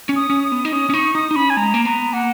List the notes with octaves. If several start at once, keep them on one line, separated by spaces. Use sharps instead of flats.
C#4
D#6
C#4
D#6
B3
D#4
C#4 D#6
C#4
D#4 C#6
D#4 D#6
D#4
C#4 B5
G#5
G#3 A#5
A#3
B3 A#5
A#3 F#5